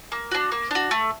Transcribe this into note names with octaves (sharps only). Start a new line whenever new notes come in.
A#3
D4 F#4
A#3
D4 F#4
A3